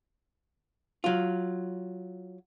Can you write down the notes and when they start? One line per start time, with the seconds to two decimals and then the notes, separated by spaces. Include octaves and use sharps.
1.04 F#3 F4